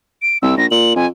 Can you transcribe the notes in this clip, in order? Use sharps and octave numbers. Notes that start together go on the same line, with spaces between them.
D7
C2 E6
A#1 A#6
A#2 F#7
F2 G#5